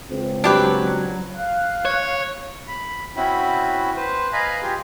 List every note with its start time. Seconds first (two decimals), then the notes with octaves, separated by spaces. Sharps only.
0.10 C#2 C4
0.44 F#3 D4 G4 B4
1.35 F5 F#6
1.85 C#5
2.68 B5
3.16 C4 C#4 E4 F#4 B5
3.96 B4 C5
4.33 B4 D#5 F5 G#5 A#5 B5
4.62 F4 G4 G#4